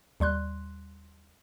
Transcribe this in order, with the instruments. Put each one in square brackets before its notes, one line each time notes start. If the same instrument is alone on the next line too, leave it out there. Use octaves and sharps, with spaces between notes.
[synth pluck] D#2 G3 C6 F#6